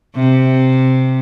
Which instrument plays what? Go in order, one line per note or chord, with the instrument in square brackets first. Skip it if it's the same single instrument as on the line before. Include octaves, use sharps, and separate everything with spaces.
[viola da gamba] C3